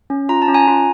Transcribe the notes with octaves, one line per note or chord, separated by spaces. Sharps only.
C#4
F4 A#5
A5
C#4
G#5 A#5
F4